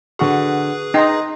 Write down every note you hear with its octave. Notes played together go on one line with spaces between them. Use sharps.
D3 F#4 G#4 B4 C#6
D#4 G5 A#5 C6